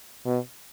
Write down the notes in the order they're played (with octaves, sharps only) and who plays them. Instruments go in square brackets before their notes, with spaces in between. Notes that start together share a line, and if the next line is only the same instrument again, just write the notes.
[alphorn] B2